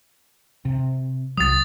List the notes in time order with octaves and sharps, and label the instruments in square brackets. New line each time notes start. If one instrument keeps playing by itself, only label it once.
[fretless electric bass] C3
[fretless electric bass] C2 F#3 [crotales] D#6 A6